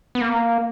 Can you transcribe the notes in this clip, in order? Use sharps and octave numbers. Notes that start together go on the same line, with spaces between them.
B3
A#3